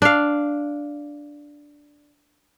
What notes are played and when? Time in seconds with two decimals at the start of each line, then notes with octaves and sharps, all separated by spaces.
0.02 D4 F5